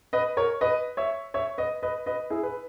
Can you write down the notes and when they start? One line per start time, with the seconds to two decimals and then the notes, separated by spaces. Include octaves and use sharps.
0.13 B4 D#5
0.37 A#4 C#5
0.61 B4 D#5
0.97 C#5 E5
1.34 C#5 E5
1.58 B4 D#5
1.83 B4 D#5
2.06 B4 D#5
2.30 E4 G#4
2.43 B4